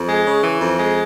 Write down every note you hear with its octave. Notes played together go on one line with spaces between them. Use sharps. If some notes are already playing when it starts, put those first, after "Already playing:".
Already playing: F2
G#3
C#3
E3
F2
G#3